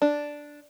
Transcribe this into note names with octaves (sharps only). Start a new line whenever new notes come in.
D4